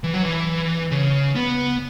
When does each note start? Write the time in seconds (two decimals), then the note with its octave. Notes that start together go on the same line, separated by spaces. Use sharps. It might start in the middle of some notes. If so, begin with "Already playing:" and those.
0.04 E3
0.14 F#3
0.23 E3
0.91 C#3
1.35 B3